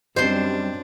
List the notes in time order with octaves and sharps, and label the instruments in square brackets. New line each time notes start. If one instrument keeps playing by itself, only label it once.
[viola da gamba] F#2 D4 [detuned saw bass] G3 [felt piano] C4 D#5 [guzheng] C5 C6